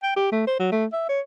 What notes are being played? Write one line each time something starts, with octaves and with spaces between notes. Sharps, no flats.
G5
G4
A3
C5
F#3
A3
E5
C#5